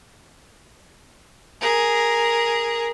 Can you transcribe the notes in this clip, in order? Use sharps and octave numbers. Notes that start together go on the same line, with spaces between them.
G#4 A#4